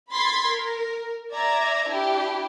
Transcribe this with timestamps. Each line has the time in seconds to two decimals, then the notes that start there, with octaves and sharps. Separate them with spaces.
0.11 B5 C6 G#6 A6 B6
0.48 A#4
1.32 D5 E5 A#5 G#6
1.90 D4 E4 G4